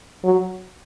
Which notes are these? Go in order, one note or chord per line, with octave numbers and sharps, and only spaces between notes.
F#3